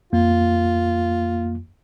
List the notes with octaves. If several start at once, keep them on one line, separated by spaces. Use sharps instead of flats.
F2 A#3 F4